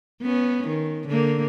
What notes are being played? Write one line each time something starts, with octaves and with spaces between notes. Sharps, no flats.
B3 C#4
D#3
D3 A#3